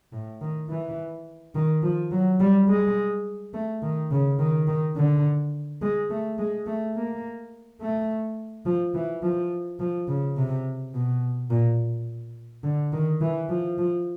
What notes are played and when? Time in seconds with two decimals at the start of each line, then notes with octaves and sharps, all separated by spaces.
0.13 A2
0.41 D#3
0.69 E3
1.55 D#3
1.83 F3
2.12 F#3
2.40 G3
2.68 G#3
3.54 A3
3.83 D#3
4.11 C#3
4.39 D#3
4.68 D#3
4.96 D3
5.82 G#3
6.10 A3
6.39 G#3
6.67 A3
6.96 A#3
7.81 A3
8.66 F3
8.95 E3
9.23 F3
9.80 F3
10.08 C#3
10.37 C3
10.94 B2
11.50 A#2
12.64 D3
12.93 D#3
13.22 E3
13.49 F3
13.78 F3